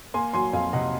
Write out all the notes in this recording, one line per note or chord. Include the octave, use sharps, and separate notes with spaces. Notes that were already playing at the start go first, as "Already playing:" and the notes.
A#3 G#5 C6
F#3 G#5 C6
F2 F5 G#5
C3 D#5 F#5